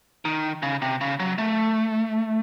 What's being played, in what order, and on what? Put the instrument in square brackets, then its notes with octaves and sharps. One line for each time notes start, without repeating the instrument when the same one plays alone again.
[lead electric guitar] D#3
C#3
C3
C#3
F#3
A3